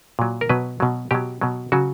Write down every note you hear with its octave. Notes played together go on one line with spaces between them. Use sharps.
A#2 F#3
A#4
B2 F#3 B4
B2 F#3
B2 F#3 G4
B2 F#3
C#3 F#3 F#4